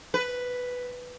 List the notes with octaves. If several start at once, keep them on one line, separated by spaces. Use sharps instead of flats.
B4